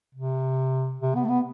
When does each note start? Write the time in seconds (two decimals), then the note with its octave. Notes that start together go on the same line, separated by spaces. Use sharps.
0.15 C3
1.01 C3
1.15 B3
1.25 A3
1.29 B3